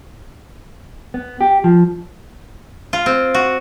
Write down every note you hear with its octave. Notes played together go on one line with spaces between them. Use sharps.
B3
G4
F3
F4
C4
F#4